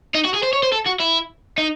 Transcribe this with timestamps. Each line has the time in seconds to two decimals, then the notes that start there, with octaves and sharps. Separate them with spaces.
0.14 D#4
0.25 F#4
0.34 G#4
0.43 C5
0.53 C#5
0.63 C5
0.72 A4
0.86 F#4
1.00 E4
1.58 D#4